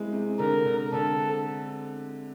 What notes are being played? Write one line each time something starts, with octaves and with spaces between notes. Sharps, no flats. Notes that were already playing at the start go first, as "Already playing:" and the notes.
Already playing: E3 G#3 C4
C3
D3 A#4
D3
D3 A4